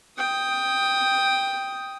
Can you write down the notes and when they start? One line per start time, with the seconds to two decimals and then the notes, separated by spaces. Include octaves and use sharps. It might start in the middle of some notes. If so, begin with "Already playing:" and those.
0.18 G5 D#6